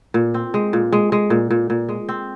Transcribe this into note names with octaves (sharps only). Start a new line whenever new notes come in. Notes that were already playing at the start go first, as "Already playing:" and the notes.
A#2
C4
G#3
A#2
G#3
G#3
A#2
A#2
A#2
G#3
C4